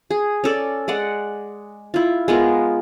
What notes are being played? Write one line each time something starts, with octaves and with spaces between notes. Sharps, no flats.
G#4
C#4 A4 D5
G#3 D5 F#5
E4 F4
G#3 B3 F4 A#4